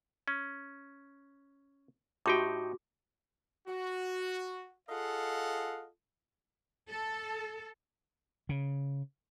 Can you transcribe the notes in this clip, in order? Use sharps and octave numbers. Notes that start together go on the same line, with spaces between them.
C#4
A2 D#4 F#4 G4 G5 D6
F#4
F4 G#4 A4 D#5 F5 F#5
A4
C#3